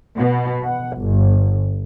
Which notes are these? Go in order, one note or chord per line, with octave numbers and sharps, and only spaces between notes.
B2
F#5
G1